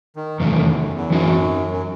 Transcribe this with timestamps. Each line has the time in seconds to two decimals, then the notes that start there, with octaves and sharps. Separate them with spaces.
0.16 D#3
0.40 E2 C3 D#3 A3
0.58 F#2
0.67 E2
0.75 F#2
0.94 E2
1.10 F#2 E3 C4 D#4 F#4
1.70 F#2